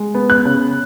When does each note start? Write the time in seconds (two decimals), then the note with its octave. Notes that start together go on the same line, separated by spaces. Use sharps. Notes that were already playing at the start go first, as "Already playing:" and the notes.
Already playing: G#3
0.15 B3
0.30 F#6
0.45 C#3